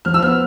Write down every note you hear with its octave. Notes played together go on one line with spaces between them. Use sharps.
F3 F6
E6
B3 F6